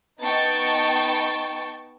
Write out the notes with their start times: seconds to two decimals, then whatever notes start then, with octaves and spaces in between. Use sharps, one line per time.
0.22 B3 D#4 G5 A5 C#6 A6